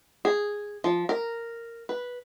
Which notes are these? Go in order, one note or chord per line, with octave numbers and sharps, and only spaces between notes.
G#4
F3
A#4
B4